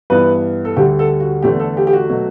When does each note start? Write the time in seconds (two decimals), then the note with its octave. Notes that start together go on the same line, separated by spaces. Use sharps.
0.10 G2 E3 B3 B4
0.65 A4
0.76 D2 D3 G3 G4
0.99 A4
1.20 F#4
1.42 E2 D3 A3 G4
1.59 A4
1.77 G4
1.87 G4
1.93 F#4
2.09 B2 F#3 A3